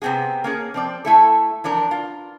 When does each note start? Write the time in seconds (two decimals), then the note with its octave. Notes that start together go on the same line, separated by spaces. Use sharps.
0.02 C3 B3 C4 F#4 G#4
0.44 A#3 C#4 G#4
0.74 F3 C4 D5
1.05 A3 E4 A4
1.64 E3 F3 D4 A#4
1.91 F4